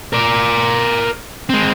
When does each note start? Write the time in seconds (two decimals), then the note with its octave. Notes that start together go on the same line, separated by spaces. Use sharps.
0.13 A#4 D5
1.49 G#3 C4